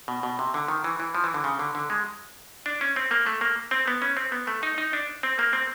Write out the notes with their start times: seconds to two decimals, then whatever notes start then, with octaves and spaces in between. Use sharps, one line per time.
0.08 B2
0.23 B2
0.39 C3
0.54 D3
0.68 D#3
0.84 E3
1.00 E3
1.15 F3
1.24 E3
1.34 D3
1.44 C#3
1.59 D3
1.75 D3
1.90 G#3
2.66 D4
2.81 C#4
2.96 C4
3.11 A#3
3.26 A3
3.41 A#3
3.71 C4
3.88 B3
4.02 C#4
4.17 C4
4.32 B3
4.47 A3
4.63 D#4
4.78 D#4
4.93 D4
5.23 C4
5.39 A#3
5.53 C4